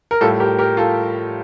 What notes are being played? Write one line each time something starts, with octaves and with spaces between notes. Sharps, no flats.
A#4
A2 G3 F4 A4
G4 A#4
G4 A#4
F4 A4